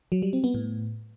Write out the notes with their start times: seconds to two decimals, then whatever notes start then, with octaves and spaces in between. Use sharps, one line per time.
0.12 F#3
0.22 G3
0.33 C4
0.44 B3
0.54 A2